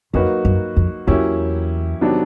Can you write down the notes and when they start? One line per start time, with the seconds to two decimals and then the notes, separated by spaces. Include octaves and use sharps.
0.13 F2 F#3 A#3 D#4 F#4 B4
0.45 F#2
0.76 F2
1.07 E2 F#3 A#3 C#4 E4 G4
2.01 C3 D#3 F#3 B3 D4